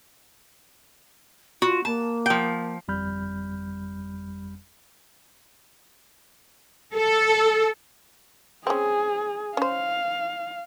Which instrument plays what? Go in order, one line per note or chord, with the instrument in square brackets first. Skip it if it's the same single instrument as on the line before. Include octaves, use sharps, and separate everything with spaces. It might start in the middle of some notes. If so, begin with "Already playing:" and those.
[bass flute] F4 [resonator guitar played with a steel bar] F#4
[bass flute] A#3 [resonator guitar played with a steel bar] A5
[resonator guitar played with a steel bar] F3 G5
[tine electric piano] G1 F2 G3 B5 F6 G6
[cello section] A4
[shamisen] C4 C#4 [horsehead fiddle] G#4
[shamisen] C#4 C5 [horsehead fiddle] F5